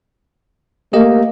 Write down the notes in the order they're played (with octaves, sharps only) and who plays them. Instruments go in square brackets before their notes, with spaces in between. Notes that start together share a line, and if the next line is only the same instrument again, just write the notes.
[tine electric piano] A3 G4 D#5 [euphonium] A#3